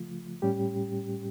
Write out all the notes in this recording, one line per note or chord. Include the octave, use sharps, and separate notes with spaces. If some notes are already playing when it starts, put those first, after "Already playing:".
Already playing: C#3 F3 A3 F4
A2 G3 C#4 G4